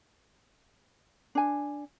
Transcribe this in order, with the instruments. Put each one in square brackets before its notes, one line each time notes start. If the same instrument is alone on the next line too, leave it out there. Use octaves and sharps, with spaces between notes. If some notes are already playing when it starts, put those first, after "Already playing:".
[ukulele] D4 G#5